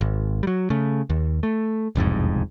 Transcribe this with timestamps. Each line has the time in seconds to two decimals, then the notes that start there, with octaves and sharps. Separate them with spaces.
0.01 G#1
0.43 F#3 G3
0.70 C#3 A3
1.10 D#2
1.43 A3
1.95 E1 C2 F2 G#2